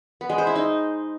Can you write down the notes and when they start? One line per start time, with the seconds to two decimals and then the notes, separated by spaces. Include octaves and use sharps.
0.21 B3
0.30 G#3
0.38 C5
0.47 E4
0.55 D#4